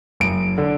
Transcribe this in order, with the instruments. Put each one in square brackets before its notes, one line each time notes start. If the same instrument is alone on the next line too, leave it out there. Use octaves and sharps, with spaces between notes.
[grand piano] F#1 D7
D3